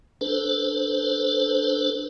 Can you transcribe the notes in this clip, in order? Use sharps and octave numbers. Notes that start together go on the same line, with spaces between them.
D4 A4 B4 C5